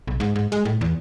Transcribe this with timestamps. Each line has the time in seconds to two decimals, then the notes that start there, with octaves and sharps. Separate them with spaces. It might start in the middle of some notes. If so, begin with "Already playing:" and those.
0.07 B1
0.20 G#2
0.36 G#2
0.52 G#3
0.65 A2
0.81 E2